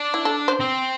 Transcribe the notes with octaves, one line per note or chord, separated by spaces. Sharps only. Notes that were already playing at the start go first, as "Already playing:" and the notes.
Already playing: D4
E4
A4
C5
C4